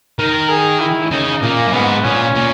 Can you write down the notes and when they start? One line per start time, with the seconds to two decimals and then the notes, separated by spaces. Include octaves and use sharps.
0.19 D#3 A#4
0.49 G#4
0.80 E4
1.11 C#3 D#4
1.42 A#2 A#3
1.67 F#2
1.73 G#2 B3
2.04 A#2 C#4
2.35 A#2